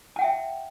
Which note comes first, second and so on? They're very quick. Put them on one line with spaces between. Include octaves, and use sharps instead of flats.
A5 F#5 G5 E5